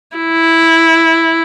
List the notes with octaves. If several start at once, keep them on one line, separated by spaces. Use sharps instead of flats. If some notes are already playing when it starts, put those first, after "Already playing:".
E4